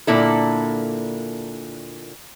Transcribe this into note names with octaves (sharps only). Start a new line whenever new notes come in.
A#2 D3 A#3 E4 A4